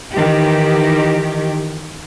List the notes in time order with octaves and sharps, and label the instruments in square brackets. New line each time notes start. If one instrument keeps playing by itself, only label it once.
[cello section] D#3 E3 G4